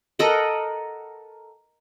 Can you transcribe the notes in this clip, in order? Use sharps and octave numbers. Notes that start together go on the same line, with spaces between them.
A4 A#4 D#5 F#5